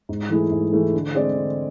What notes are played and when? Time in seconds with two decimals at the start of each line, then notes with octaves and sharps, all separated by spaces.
0.09 G#2
0.30 E3 A3 E4 G#4
0.52 G#2
0.72 E3 A3 E4 G#4
0.94 D3
1.15 G#3 C4 G#4 D5
1.36 D3